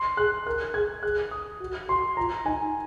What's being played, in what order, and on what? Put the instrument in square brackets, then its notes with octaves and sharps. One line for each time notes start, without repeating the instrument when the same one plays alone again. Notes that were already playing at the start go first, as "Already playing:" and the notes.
Already playing: [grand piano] C6
[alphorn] G#4 [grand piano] F#6
[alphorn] A#4 [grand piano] F#6
[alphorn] G#4 [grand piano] G#6
[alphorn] G#4 [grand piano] F#6
[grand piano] D#6
[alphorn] F#4
[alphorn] F#4 [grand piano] C6
[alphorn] F4 [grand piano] A#5
[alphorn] D#4 [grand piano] G#5